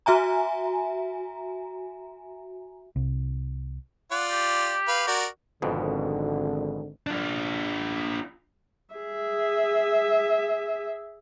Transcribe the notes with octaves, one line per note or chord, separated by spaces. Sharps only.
F#4 E5 G#5 A#5
C2
F4 D5 F#5
G4
B4 F5
F#4 A#4 D5
G#1 F2 G#2 B2 D3
D4 F4
G#4 E5